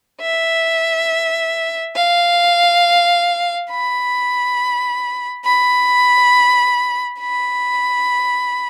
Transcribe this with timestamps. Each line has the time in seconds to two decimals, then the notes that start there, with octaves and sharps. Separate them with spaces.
0.22 E5
1.96 F5
3.71 B5
5.45 B5
7.20 B5